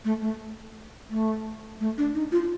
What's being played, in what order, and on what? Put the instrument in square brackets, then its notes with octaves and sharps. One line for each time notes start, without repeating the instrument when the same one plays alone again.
[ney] A3
A3
A3
A3
D4
D#4
F4